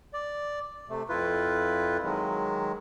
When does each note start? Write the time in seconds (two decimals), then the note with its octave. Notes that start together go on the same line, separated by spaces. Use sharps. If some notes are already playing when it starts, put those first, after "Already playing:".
0.14 D5
0.89 C3 A3
1.09 F2 E4 F4 B4
2.04 D#3 F#3 G#3